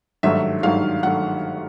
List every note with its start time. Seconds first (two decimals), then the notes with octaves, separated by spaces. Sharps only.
0.23 G#1 G2 D#3 F#3 A3 E5
0.63 G#1 G2 D#3 F#3 A3 F5
1.03 D#3 F#3 A3 F#5